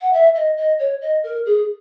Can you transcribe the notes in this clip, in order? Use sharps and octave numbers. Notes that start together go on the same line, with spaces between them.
F#5
E5
D#5
D#5
C#5
D#5
A#4
G#4